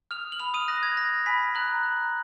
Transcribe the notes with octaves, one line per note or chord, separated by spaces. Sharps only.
D#6 F6 F7
F#7
B5 F6 F7
D#6 D#7
F#6 A#6
G#6
F6 A#6
G#5 B5 B6
A#5 F#6 F#7
A#5